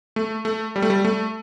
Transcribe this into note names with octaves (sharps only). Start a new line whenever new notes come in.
A3
A3
G3
A3
G3
A3